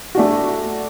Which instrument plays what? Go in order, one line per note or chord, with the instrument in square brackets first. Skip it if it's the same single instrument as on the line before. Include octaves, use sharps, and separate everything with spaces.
[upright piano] A3 D4 F#4